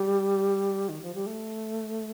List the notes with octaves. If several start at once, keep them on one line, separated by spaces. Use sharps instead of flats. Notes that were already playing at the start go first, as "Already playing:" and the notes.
Already playing: G3
D#3
F3
G3
A3